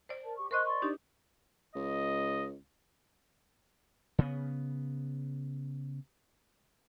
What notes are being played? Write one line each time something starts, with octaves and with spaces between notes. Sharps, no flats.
C5 D5
A#4 A5
G4 C#6
A#4 C5 D#5 C6 C#6 F#6
D5 C6 C#6
D4 D#4 G4
C#2 D#5
C#3 B3